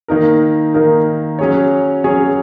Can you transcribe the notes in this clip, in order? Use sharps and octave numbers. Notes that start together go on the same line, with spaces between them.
D#3 A#3 D#4 A#4
D#3 A#3 D#4 A#4
F#3 C#4 G#4 C#5
F#3 C#4 G#4 C#5